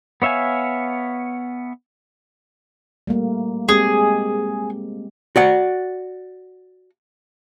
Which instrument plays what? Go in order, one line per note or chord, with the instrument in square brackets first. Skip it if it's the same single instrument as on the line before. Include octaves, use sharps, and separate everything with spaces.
[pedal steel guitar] B3 C#5 E5 F5 G#5
[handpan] G3 A3 A#3
[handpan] G#3 C4 G4 [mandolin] G#4
[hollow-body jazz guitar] F#4 D5 F#5